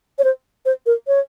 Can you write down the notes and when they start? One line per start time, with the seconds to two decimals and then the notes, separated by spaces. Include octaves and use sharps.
0.19 C#5
0.24 C5
0.66 C5
0.86 A#4
1.07 C#5